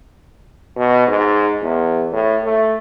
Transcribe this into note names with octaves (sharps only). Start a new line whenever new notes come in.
B2
G#2
E2
A2
A3